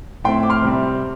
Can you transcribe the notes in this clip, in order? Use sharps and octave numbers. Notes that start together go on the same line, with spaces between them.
A2 A3 C4 G5 C6
D6
C6 F6
C3 G3 C4